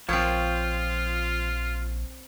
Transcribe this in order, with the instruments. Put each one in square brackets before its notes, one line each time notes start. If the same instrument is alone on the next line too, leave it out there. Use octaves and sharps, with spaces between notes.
[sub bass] A#1 [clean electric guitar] F3 [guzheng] C4 C#5 [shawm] F4